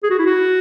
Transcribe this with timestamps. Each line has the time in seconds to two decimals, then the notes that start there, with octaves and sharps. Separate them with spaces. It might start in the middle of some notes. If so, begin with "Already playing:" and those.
0.03 G#4
0.10 F#4
0.19 E4
0.26 F#4